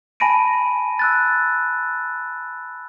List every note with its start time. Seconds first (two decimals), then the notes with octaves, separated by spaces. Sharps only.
0.20 G#5 A5 B5 A#6 D7 D#7
0.99 E6 F#6 A6